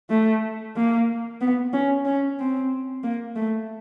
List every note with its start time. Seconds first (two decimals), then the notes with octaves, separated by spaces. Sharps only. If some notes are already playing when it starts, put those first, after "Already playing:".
0.10 A3
0.76 A#3
1.41 B3
1.73 C#4
2.05 C#4
2.39 C4
3.04 A#3
3.36 A3